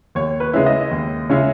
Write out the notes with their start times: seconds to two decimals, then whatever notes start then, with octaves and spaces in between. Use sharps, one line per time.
0.15 D#2 C#5
0.40 B4
0.53 C#3 G#3 C#4 E4
0.66 D#5
0.91 D#2
1.30 C#3 G#3 C#4 E4